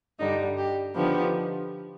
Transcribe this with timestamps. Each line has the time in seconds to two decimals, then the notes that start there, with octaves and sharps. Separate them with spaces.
0.19 G2 D3 G3 D#4
0.58 G4
0.95 D3 F3 B3 D#4 G4